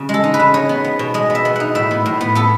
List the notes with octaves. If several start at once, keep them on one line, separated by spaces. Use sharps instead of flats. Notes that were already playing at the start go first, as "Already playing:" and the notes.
Already playing: C#3 F#4
G#3 A4
D#4
B4
C#3
D#4 C#5
B3
B3
B2
G#3 D#5
B3
E5
B3
D#4 F#5
A2 E5
B3
A2
B3
B3 A4